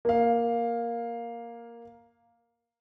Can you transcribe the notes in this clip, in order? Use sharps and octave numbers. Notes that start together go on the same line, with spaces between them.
A#3 F5